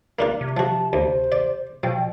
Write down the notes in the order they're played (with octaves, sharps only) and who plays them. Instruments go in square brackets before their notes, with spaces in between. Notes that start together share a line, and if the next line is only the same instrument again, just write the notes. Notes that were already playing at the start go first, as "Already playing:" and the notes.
[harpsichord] A#3 D4 F4
[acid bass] C3
[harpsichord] F3 F#4 [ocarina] A5
[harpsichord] D2 [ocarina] C5
[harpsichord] D5
[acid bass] B2 [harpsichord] F3 [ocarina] G5